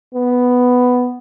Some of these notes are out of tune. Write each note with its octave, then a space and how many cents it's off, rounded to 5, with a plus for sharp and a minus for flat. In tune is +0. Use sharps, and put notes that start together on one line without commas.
B3 +5